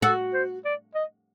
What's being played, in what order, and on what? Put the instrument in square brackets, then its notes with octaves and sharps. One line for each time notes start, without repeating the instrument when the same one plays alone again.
[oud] F#4 [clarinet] A4
[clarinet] C5
D5
D#5